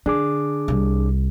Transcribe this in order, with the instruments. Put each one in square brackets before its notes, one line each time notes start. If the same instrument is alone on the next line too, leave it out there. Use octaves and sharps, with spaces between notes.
[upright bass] D3 [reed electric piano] D4 G#4 D6
[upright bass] C2